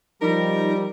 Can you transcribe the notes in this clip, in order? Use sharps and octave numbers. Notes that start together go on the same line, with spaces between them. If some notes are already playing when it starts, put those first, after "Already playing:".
F3 G3 D#4 A#4